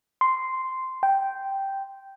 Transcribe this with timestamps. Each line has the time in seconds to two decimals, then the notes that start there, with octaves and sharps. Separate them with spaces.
0.21 C6
1.03 G5